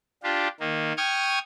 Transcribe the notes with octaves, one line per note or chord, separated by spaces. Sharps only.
D4 F4 G4
D#3 A#3
G5 C#6 D#6 F6 G#6